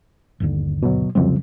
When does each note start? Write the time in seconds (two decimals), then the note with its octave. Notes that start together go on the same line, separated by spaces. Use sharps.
0.40 G1 D#2 D3
0.83 B2 F#3
1.15 C2 F2 C#3 F#3 G3 C4